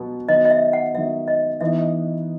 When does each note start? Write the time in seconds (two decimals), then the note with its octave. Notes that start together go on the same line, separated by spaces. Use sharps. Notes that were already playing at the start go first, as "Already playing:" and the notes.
Already playing: B2 F#3 B3
0.29 D#3 F#3 B3 D#5
0.45 D#5
0.50 E5
0.73 F#5
0.94 D#3 F#3 B3 E5
1.28 D#5
1.61 E3 B3 D#4 E5